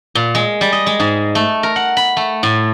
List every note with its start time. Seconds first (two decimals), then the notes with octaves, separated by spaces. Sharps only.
0.15 A#2
0.35 G#3
0.61 G3
0.72 D#5
0.86 G#3
1.00 G#2
1.35 A3
1.63 A#4
1.76 F#5
1.97 B5
2.17 A3
2.43 A2